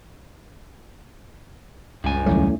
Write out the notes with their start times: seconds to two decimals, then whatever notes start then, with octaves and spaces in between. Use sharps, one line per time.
2.04 C#2 G2 G#5
2.26 D#2 F#3 G3 A3 C#4 E4